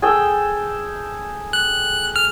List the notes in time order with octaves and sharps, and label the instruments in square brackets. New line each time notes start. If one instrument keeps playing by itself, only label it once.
[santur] G#4 A4 G5
[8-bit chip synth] F#6
F6